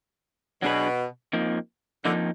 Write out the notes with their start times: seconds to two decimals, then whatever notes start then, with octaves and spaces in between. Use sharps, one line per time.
0.62 B2 F#3 D4 G#4 B4
1.33 F2 F3 A#3 D#4
2.04 F2 D3 F3 A#3 D#4